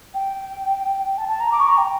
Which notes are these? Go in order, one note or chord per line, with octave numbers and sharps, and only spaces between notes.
G5
A5
A5
A#5
D6
C#6
A#5
G5